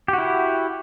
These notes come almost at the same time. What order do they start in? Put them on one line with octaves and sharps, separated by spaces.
G4 F#4 E4